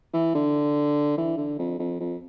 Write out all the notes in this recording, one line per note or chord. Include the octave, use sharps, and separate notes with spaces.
E3
D3
E3
D3
F2
F2
F2